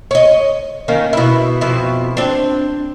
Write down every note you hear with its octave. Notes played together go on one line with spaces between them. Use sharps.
C#5 D#5
D#3 A#3 C#4
B2 E4
F2 B2 E4
C4 D4